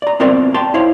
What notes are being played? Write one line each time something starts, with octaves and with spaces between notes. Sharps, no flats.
D5 A#5
B3 C4 F4 A#4 C5 D5
G5 A5 C6
E4 C5 C#5 F5